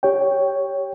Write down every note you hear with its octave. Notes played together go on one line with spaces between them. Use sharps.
G4 C#5 G5